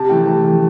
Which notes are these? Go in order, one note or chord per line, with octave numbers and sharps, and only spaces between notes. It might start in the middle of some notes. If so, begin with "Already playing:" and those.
Already playing: C3 A5
E3 A3 G5
C3
E3 A3